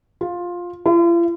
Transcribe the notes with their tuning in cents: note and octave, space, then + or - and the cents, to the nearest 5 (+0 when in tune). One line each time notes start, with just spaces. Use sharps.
F4 +10
F4 -45